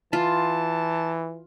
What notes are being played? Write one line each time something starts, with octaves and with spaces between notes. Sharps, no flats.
E3 F4 A5